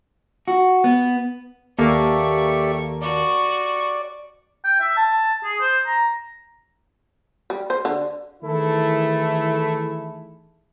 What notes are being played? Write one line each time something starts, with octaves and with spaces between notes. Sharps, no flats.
F#4
B3
D#2 A#3 G4 A4 D5 E5 C#6
F#4 D5 C#6
G5
E5
A5
G#4
C5
A#5
G3
C5
D3
D#3 E3 A3 E4 G#4 A4